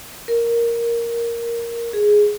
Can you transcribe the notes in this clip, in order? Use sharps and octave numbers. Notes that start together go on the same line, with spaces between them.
A#4
G#4